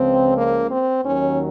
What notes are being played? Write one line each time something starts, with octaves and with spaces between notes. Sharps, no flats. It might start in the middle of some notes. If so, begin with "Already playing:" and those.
Already playing: C#2 C#3 F3 C4
A#3
C4
D#2 D#3 F#3 C#4